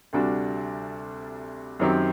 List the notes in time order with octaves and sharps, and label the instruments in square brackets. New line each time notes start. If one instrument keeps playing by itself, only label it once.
[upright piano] D2 C3 G3 D4 F#4
F#2 D#3 F#3 C4 G4